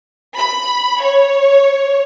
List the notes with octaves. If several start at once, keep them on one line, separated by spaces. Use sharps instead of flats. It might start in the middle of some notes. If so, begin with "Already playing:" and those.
B5
C#5